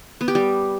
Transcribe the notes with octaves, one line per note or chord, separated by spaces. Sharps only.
B3
G4
G3